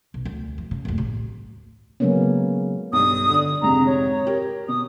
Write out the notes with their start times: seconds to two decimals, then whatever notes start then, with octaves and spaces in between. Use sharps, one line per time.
0.14 B1
0.25 D2
0.58 E3
0.71 C#3
0.85 F#1 D2
0.98 A1
2.00 C#3 F#3 G#3 A#3 B3 C#4
2.93 B1 G2 D#6
3.30 D3 D5
3.62 F2 G#2 C3 A#5
3.86 C#5
4.27 G4 A#4
4.68 B2 D#6